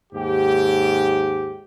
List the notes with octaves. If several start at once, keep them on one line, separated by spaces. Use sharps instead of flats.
D#2 G#2 G4